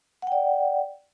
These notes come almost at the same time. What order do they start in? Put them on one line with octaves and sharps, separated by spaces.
F#5 G5 D5